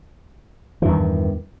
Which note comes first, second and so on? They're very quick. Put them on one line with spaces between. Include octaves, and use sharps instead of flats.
E3 G2 E2 D#3